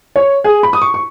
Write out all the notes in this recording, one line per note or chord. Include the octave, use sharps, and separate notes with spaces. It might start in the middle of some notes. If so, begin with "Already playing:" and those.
C#5
G#4
B5
D#6
C#6
C#6